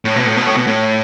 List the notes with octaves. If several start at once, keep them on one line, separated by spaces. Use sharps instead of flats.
A2
B2
A2
B2
A2
B2
A2